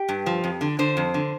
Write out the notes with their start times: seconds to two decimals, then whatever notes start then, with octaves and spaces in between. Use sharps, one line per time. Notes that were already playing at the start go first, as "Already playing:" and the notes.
Already playing: G4
0.09 G2
0.26 F3
0.44 F2
0.61 D3
0.79 D3 C5
0.97 F2
1.14 D3